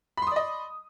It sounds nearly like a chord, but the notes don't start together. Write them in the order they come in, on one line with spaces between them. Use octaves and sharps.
B5 C6 D#6 D5 D#5